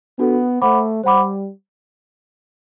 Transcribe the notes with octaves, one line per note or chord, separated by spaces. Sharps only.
B3 D4 F#4 A4
A3 C5 F#5 B5 D6
G3 C5 F#5 B5 D6